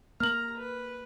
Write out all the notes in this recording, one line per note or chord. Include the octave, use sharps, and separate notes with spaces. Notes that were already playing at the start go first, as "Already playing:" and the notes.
A#3 A#5 F6 F#7
B4